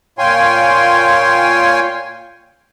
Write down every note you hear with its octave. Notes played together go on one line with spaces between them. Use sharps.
A#2 F4 C#5 G5 G#5 C6